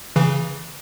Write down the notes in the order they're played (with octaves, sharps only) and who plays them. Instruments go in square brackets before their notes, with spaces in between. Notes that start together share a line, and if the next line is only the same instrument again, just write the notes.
[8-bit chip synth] C#3 E3